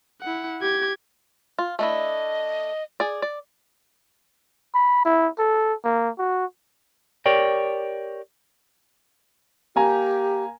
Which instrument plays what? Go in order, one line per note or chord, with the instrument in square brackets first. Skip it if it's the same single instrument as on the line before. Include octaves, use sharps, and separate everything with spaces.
[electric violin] E4 F#5
G4 G#6
[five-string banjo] F4
[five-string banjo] A3 D4 E4 [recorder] D#5
[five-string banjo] G#4 D5
D5
[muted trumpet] B5
E4
A4
A#3
F#4
[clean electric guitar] G4 A#4 C#5 D5 G5
[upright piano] A#3 G#5 A#5 [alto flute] G4